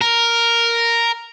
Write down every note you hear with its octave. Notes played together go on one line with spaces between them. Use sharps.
A#4